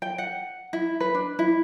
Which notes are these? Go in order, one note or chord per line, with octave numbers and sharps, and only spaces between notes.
G5
F#5
E4
B4
D4
E4